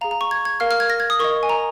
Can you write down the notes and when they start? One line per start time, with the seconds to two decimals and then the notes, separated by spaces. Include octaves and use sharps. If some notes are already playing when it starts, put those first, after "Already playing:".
0.01 F5 A#5
0.04 G#4
0.11 A#5
0.21 C#6
0.31 G#6
0.45 G#6
0.60 A#4 F5 F6
0.71 F6
0.80 G#6
0.90 A#6
1.00 G#6
1.10 D#6
1.19 A#4 D#5 C#6
1.43 G#5
1.49 A#5